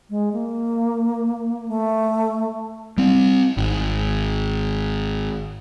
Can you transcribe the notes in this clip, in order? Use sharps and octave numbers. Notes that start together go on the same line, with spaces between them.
G#3
A#3
A3
G3 C4
G#1